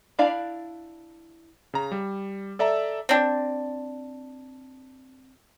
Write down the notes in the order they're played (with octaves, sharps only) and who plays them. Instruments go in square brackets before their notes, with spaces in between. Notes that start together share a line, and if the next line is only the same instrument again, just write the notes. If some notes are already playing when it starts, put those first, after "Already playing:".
[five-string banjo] D4 E4 D5 F5 B5
[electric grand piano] C#3 A#5
G3
A4 D5 E5 A5 A#5
[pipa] C4 D4